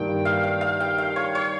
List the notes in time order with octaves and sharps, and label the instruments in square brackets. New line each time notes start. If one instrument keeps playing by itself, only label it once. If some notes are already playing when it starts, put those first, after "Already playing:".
Already playing: [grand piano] G2 D#3 G3 A#3 [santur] G5
[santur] F5
F5
F5
G5
F5
C#5
C#5